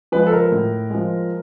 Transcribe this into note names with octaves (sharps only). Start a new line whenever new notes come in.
F3 G#3 B4
A4
A#4
A2
F3 G#3